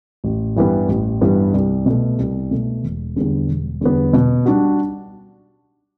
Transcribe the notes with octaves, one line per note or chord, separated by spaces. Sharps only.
A1
G2 E3 G3 B3
A1
G2 E3 G3 B3
C2
B2 A3
C2
B2 A3
E1
E2 D3 G3 B3
E1
E2 D3 G3 B3
B2
G3 D4 F#4